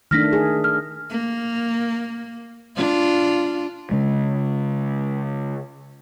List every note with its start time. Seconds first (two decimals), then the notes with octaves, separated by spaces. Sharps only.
0.11 D#3 A3 D4 F6 A#6 B6
0.33 G#4
0.64 F6
1.10 A#3
2.76 D4 F4
3.91 C#3 G#3